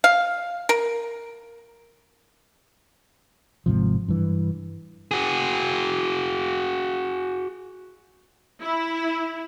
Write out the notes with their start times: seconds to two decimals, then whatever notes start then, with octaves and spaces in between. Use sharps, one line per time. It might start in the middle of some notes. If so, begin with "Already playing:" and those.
0.04 F5
0.69 A#4
3.66 G#1 G#2 C3 F3
4.09 G2 E3
5.11 F#4 G#4
8.62 E4